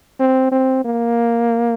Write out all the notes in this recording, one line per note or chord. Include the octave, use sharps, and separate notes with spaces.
C4
C4
A#3